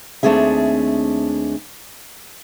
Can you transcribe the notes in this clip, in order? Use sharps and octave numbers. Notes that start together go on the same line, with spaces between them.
D#2 A3 C4 D4 G#4 E5